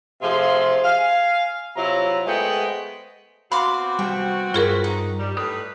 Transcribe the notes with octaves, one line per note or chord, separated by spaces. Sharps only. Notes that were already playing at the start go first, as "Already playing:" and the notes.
C3 F3 A3 G#4 F5 C6
F5 G#5
C3 F#3 E4 F4 A#5
G#3 A3 B3 C5 D#5 G5
B2 C4 F#4 F5 B5 C6 D6
G3 C5 G5 A5
G2 F4 G#4 A#4 B4
D#4
G3
A2 G3 B4 D#6